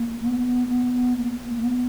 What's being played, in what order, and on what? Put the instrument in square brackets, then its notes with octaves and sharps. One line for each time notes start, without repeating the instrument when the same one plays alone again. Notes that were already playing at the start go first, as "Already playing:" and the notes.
Already playing: [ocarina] A#3
B3
A#3
B3
A#3
A#3
B3